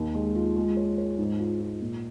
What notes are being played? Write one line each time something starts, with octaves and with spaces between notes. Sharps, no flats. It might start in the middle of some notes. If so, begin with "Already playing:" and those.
Already playing: D#2
G#3
F4
G#3
C#5
C#5
G#2
F4
F4
A#2